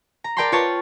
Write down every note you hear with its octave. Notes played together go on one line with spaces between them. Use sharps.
A#5
A#4 D5 G5 A5 B5 C6
F4 B4 C#5 A5